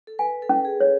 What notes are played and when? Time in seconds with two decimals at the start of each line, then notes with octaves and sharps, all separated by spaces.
0.07 A4
0.19 B4 G#5
0.42 A4
0.49 C#4
0.65 G#4
0.80 C#5